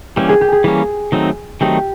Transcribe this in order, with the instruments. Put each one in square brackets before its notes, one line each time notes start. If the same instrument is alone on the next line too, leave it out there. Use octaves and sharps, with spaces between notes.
[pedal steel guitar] E3 G3 A#3 C#4 [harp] G4
[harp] G#4
G4
G#4
[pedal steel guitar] E3 G3 A#3 C#4
D#3 F#3 A3 C4 D#4
[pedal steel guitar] D#3 F#3 A3 C4 D#4 [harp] G4